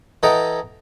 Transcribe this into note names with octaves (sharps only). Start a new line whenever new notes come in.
E3 A4 D#5 F#5 G5 A#5